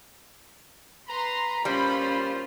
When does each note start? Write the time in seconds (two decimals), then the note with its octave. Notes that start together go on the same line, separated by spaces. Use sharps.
1.09 B4 A#5 C6
1.65 A#2 G3 C#4 F4 C5 B5